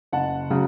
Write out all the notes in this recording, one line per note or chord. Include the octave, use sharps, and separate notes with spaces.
F#1 F#5 A5
C#3 F#3